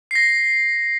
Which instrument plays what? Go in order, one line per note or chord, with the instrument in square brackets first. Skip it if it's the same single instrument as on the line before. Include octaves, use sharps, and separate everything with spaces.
[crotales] A#6 C7